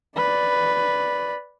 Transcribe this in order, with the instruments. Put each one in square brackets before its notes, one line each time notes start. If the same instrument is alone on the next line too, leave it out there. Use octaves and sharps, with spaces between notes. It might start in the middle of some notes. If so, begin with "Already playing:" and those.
[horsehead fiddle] B4 D5